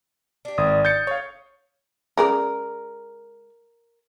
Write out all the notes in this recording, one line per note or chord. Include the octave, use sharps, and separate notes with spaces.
D4 G4
G#1 D#6
G6 A6 C#7
A3 C#5 F5
C#3 G#3 A#4 D5